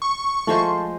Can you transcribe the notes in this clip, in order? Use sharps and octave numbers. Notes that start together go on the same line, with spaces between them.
C#6
F3 G#3 A3 C5 A5